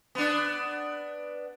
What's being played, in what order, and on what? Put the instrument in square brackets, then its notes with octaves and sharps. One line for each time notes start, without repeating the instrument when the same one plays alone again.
[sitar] B3 D4